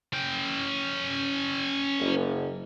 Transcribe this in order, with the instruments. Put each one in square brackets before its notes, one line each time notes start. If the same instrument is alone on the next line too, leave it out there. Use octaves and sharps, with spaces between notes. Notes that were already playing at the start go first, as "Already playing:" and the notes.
[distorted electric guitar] C#4 G5
[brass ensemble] F#1